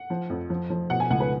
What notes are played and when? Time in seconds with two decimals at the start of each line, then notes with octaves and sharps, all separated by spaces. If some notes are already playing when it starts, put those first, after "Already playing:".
Already playing: F#5
0.10 F3
0.30 F2
0.50 F3
0.70 F3
0.90 B2 F#5
1.00 G#5
1.10 C#2 F#5
1.20 B4